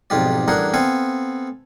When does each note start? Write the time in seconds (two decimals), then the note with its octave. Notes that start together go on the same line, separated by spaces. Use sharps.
0.10 B1 F2 G#2 F4 G4 D5
0.48 A1 G2 D4 G#4 A#4 F#5
0.74 B3 C4 A4 F5 G#5